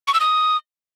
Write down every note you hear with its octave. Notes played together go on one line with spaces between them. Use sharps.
C#6
E6
D#6